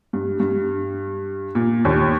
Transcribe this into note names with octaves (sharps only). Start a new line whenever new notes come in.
G2
G2
A#2
D#2